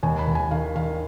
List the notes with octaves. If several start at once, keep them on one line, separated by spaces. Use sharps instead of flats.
D#2 G#5
B5
D#2
G#5
D#3 F5
D#3 F5